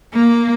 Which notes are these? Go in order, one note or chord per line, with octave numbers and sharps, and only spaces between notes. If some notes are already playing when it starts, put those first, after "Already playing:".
A#3